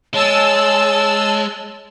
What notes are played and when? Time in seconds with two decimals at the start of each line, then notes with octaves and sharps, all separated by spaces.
0.14 G#3 C#5 A5 E6